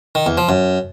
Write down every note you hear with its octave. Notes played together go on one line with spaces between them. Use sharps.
D#3
E2
F3
F#2